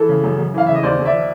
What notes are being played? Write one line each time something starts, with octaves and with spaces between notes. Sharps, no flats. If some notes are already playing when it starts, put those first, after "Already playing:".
Already playing: E3 A4
C#3
F#2
F#2
E3 F5
C#3 E5
D#5
D#2 C5 D5
D#2
D5 E5
F3